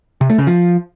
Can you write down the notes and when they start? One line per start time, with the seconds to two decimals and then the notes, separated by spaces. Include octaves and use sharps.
0.21 C3
0.30 A3
0.38 C#3
0.47 F3